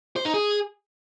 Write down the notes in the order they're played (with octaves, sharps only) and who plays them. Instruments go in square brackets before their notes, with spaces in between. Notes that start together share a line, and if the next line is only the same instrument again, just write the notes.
[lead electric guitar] C5
D#4
G#4